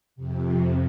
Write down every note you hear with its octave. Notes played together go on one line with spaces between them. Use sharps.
F2 C3